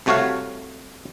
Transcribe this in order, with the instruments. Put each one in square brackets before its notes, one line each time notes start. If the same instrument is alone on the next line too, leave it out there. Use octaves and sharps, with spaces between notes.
[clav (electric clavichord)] C2 C3 A3 F#4 C#5 F5